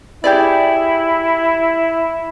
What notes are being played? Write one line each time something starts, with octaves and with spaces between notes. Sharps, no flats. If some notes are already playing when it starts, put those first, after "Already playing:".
E4 G4 G#4 D5